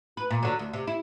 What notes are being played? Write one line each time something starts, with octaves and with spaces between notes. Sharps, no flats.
B4
A#2
D3 F#3
D2
C3
E4